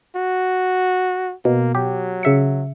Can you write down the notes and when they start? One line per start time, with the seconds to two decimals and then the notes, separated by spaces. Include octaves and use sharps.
0.16 F#4
1.45 B2 A#3
1.75 F#3 G4
2.23 C#3 E5 C#7